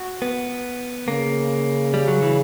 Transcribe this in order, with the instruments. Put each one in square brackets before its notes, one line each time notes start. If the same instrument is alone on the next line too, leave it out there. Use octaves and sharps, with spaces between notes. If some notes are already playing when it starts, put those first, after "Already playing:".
Already playing: [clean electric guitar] F#4
B3
[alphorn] C#3 [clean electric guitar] A#3
[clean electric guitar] G3
F#3
E3